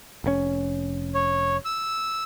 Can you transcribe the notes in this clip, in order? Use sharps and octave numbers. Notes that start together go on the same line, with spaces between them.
F1 G#2 C#4
C#5
E6